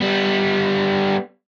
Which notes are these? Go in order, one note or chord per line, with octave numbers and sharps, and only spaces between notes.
G3 B3